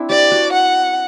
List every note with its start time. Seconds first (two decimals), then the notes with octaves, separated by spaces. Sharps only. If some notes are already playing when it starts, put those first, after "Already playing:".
Already playing: C4 D4 E4
0.10 G4 D5
0.32 F#4
0.52 F#5